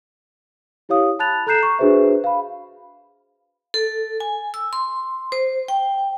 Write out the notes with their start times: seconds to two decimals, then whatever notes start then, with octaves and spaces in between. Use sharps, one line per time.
0.89 E4 G4 C#5 F5 D#6
1.19 A5 B5 F#6 A6 F7
1.47 A4 A#5 F#6 G6 C7 E7
1.60 A#5 C#6
1.79 D4 F#4 G#4 B4 C5 E5
2.24 F5 B5
3.74 A4
4.20 G#5
4.54 E6
4.73 C6
5.32 C5
5.68 G5